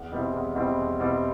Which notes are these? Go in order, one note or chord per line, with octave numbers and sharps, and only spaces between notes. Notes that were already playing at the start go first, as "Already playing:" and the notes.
Already playing: E2
B2 G3 C4 E4
E2
B2 G3 C4 E4
E2
B2 G3 C4 E4